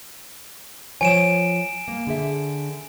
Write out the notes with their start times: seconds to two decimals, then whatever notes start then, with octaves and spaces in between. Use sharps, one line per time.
1.01 F3 C5 C#5 G#5 D7 E7
1.88 A#3
2.07 D3 G#4 E5